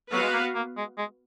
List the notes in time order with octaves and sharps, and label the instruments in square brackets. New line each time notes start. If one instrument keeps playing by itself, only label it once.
[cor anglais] F#3 [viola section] B3 F#4 B4 F5
[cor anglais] G#3
A#3
A#3
G#3
G#3